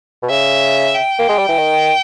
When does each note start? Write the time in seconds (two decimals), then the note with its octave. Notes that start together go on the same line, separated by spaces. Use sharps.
0.23 B2
0.30 C#3 E5
0.94 G5
1.19 A#3
1.29 G#3
1.38 G3
1.48 E3
1.58 D#3